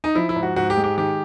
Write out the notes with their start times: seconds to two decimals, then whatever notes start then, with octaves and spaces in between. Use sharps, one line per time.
0.04 D#4
0.15 F3 E4
0.29 E4
0.36 G#2
0.43 F#4
0.56 G#2 F#4
0.70 G4
0.77 G#3
0.84 G4
0.98 D#3 G4